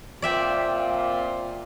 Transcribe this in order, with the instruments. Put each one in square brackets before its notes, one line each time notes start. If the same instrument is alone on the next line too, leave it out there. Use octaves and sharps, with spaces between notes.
[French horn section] A#2 C4 F4 [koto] D5 E5 G5